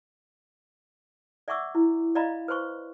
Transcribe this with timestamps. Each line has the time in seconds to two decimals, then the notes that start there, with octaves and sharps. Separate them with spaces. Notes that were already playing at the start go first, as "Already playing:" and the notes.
1.48 D5 E5 F#5 C#6 D6 E6
1.75 E4
2.15 D5 D#5 F5 A#5 B5
2.48 B4 C5 C6 C#6